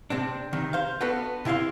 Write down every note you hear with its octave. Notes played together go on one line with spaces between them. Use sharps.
C3 C4 D4
C3 D#3
C5 F5
B3 D4 F#4 A4 B4
C3 E4 G4 F5 C6